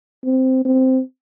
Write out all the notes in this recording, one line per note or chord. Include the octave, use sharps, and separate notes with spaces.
C4
C4